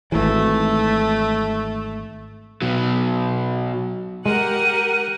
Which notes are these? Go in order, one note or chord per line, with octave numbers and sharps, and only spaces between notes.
G#1 E3 A3
B2 F#3
G#3 G4 A#4 F#5 D#7